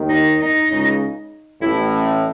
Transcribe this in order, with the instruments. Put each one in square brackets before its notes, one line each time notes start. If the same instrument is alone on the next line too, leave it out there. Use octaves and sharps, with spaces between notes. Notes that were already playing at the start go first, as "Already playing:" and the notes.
Already playing: [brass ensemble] D#2 D#3
[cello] D#4
D#4
[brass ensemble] C#2 C#3
[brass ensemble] A1 A2 [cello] E4